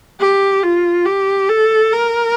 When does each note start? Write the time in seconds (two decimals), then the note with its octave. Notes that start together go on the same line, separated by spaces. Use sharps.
0.20 G4
0.63 F4
1.06 G4
1.49 A4
1.93 A#4